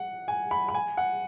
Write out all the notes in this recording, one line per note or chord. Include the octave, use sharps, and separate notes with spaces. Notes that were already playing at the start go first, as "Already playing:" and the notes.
Already playing: F#5
G#5
B5
B5
G#5
F#5